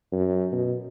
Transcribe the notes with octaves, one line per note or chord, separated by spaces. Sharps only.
F#2
B2